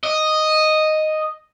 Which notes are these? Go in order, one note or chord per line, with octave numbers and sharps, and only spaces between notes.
D#5